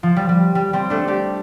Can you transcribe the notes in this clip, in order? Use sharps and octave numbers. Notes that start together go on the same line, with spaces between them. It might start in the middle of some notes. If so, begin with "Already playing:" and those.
F3
G3
G3
G3
G3 C4
A3 D4
D4 G4